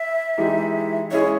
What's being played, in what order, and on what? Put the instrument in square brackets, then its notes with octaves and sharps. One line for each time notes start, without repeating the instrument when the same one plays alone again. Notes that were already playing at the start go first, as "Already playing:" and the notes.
Already playing: [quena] E5
[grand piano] E3 G#3 D#4 G4
[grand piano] G#3 C#4 E4 G#4 D#5 [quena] C#5